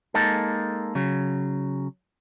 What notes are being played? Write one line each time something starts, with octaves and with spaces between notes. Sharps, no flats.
G#3 A#3 D#4 A4
C#3 F#3